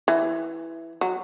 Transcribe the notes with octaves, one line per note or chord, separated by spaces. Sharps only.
E3
F#3